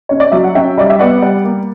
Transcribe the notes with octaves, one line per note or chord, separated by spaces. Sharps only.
C#4 C#5
D5
F#3 E5
F#5
C#4 E5 G5
G3 D5
E5
B3 D5 F#5
G3
A#3